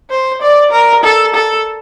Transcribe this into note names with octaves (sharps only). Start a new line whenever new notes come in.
C5
D5
A#4
A4
A4